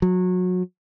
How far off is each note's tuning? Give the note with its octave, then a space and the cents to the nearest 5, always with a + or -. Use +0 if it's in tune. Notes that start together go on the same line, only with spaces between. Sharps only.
F#3 -25